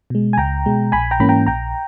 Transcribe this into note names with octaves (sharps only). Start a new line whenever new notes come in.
B2 G#3
G#5
C#2 G5 A#5
B2 G#3
A#1 G#5 B5
G5 A#5
G#2 E3 A#3 C#4 B5
G5 A#5
A#1 G5 A#5